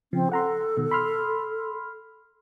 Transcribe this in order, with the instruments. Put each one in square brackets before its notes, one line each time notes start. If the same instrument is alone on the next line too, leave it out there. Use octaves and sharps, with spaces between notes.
[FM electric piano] C#3 F3 [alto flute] C4
[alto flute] A4 [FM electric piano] F#5 A#5 C6
[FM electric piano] B2 D#3
B5 C6 F6